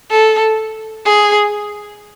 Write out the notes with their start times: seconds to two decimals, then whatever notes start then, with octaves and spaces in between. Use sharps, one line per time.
0.11 A4
1.06 G#4